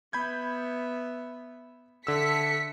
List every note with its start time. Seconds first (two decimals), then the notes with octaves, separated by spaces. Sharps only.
0.13 B3 E5 B5 G6 G#6
2.07 D3 A4 E5 E6 B6 C#7